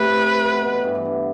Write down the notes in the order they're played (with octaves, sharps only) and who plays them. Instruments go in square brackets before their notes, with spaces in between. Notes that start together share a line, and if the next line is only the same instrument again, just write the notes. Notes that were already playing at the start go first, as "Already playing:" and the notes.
Already playing: [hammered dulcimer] A2 C3 A3 C4 [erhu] B4
[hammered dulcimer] B2 B3
B2 B3
A2 A3
G2 G3
E3
D3